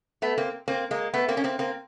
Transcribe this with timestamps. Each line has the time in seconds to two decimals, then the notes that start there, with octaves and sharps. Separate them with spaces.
0.22 A3 B3
0.38 A#3 C4
0.68 A#3 C4
0.91 G#3 A#3
1.13 A3 B3
1.28 A#3 C4
1.37 C#4
1.44 A#3 C4
1.59 A#3 C4